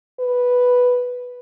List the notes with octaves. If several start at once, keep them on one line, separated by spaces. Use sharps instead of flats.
B4